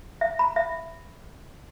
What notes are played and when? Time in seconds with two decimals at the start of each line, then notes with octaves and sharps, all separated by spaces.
0.21 E5
0.39 B5
0.56 E5